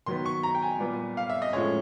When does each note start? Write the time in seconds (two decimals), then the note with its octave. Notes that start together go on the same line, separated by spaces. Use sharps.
0.06 D#3 F#3 B3 C6
0.26 C#6
0.43 A#5
0.55 G5
0.62 G#5
0.80 A#2 G3 B3
1.17 F5
1.30 E5
1.42 D#5
1.53 A2 F3 G#3 C#4 C#5